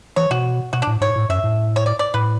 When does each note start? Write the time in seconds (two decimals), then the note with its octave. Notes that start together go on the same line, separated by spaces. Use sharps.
0.16 E3 C#5
0.31 B2 F#4
0.73 B2 F#4
0.82 D4
0.87 A2
1.01 G#2 C#5
1.16 A2
1.29 F#2 E5
1.44 A2
1.76 C#5
1.86 D5
1.99 D5
2.14 A2 B4